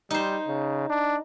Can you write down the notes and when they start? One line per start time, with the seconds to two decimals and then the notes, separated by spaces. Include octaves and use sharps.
0.11 G3 D#4 C5
0.48 C#3
0.89 D4